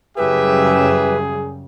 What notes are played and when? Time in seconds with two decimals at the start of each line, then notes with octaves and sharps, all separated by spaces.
0.17 F#2 A2 C#3 G3 G4 G#4 B4 E5